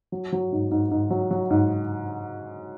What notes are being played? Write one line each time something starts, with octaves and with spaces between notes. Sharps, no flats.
F#3
F#3
G#2
G#2
G#2
F#3
F#3
G#2